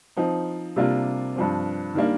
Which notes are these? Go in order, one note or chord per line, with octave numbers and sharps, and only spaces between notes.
F3 C4 D#4
C3 G3 A#3 D4 F4
G2 F3 C4
D#3 G3 A#3 D4